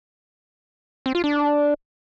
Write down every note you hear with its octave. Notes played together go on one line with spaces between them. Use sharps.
C4
F4
D4